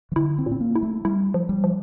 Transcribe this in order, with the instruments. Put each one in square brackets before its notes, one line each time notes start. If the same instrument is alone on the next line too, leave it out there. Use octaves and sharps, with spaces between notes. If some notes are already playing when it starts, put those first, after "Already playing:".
[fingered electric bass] E3
[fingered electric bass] D3 [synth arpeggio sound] E4
[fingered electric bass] C4
[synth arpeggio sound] A#2
[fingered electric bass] C4
A#3
[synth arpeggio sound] E4
[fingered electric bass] A3
[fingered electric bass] G3 [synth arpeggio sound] E4
[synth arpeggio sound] F3
[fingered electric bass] G3
[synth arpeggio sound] F3